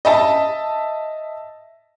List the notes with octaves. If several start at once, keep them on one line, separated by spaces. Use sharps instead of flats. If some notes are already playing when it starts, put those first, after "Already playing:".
D#5 E5 A5